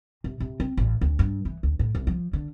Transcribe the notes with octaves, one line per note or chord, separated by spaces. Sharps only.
C3
C3
C4
A1
D2
G2
E3
D2
A2
C2
F3
D3